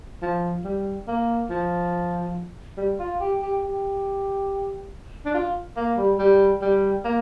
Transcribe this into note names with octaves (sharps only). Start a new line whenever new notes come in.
F3
G3
A#3
F3
G3
F4
G4
G4
G4
D4
F4
A#3
G3
G3
G3
A#3